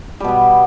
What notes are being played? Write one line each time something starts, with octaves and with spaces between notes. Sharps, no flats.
B2 G3 B3